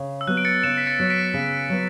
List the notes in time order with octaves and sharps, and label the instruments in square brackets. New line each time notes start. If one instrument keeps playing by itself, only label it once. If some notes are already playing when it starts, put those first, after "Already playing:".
Already playing: [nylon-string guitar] C#3
[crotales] E6
[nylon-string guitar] F#3 B3 [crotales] F#6
[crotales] D7
A6 C#7
[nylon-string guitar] C#3 [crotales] C#7 E7
[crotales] B6
A6 C#7
[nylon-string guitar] F#3 B3
[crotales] B6 D7
[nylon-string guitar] C#3
F#3 B3